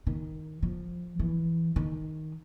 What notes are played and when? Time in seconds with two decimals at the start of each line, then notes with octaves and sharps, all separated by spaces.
0.07 D#3
0.63 F3
1.19 E3
1.76 D#3